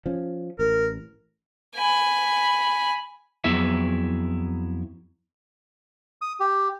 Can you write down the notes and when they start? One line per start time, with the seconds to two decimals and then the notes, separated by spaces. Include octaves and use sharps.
0.06 F3 C#4
0.59 A1 A#4
1.76 G#5 B5
3.44 F2 F#3 B3 E4 G#4 E5
6.21 D#6
6.40 G4